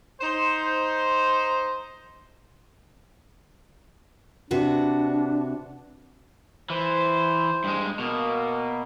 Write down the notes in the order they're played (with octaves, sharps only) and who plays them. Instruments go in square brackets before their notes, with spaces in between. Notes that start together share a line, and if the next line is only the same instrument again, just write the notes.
[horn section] D#4 C5
[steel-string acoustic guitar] C3 F#4 B4 [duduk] D4
[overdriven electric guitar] E3 [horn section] C5
[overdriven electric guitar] G2 G#3
[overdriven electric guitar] B2 [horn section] A#3